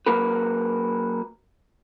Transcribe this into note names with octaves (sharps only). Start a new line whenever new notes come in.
F#3 A#3 A#4 B4